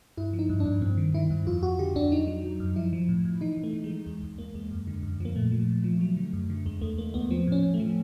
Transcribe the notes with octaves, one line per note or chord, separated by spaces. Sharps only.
G2 E4
F3
D#4
G2
G2 D4
G2 C4
D#3
D#3 E4
G2
F2 F4
F2 F#4
D3 G4
F2 D4
F#3 D#4
F#3
F#3
F#2
F3 E4
F3
A2
A2
E3 D#4
E3
A3
E3
G#3
E3
E2 G#3
E2
E2 A#3
E2 G#3
F#2
D3
F#2
F3 A#3
A#2 A3
F3
A#2
F3
F#3
D3
F#2
D3
E2 G#3
E2 A3
E2 A#3
E2 B3
F3 C4
A2 C#4
A2
A3
F3